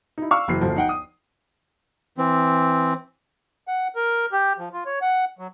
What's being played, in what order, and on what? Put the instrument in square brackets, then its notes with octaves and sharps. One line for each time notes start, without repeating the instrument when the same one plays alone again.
[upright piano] D#4 E4
F5 C#6 E6
F#1 E3 C7
G1 D2 F3
D#4 F#5 G5
D#6
[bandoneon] E3 C4
[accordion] F#5
A#4
G4
F3
F4
C#5
F#5
F#3